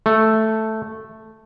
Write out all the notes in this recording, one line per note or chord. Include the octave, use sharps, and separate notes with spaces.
A3